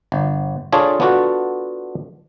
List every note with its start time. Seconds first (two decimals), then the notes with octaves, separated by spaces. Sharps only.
0.12 G1
0.72 D4 F4 G#4 A4 C#5
1.00 B3 D4 F4 F#4 A4